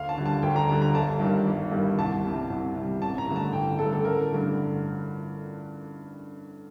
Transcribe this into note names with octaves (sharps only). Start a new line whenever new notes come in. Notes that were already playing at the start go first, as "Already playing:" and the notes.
Already playing: D2 F5
A5
D3 G3
A5
D2 G5
A#5
D3 G3 A5
A#5
G1 A5
G2 D#3 G3
G1
G2 D#3 G3
C2 A5
C3 G3
C2
C3 G3
A1 A5
A#5
G2 D3 A3
A5
A1 G5
G2 D3 A3 A4
A4
A1 A#4
G2 D3 A3